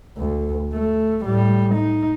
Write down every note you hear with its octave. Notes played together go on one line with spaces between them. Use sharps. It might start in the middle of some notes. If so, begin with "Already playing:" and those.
D2
A3
A2 G3
D#4